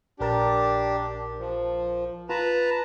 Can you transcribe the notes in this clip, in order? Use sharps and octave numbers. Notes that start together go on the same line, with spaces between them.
A#1 D4 G4 A#4 A5
F3
F4 B4 A5 A#5